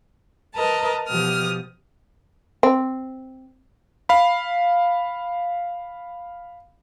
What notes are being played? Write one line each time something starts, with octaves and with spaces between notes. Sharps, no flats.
A#4 B4 D#5 A5 A#5
B2 F3 G4 D#6 F6
C4
F5 B5